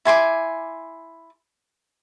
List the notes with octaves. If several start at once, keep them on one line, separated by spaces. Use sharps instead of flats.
E4 G#5 C6 D6